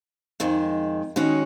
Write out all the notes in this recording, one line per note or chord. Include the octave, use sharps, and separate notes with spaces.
F2 D#3 G#3
D#3 G#3 C#4 F#4 C#5